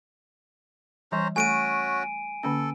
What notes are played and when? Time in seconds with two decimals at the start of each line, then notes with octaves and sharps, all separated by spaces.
1.12 E3 G3 C#4 C5 A#5
1.36 A3 C#4 F#4 A4 G#5 D7 D#7
2.43 D3 A#3 C#4 A4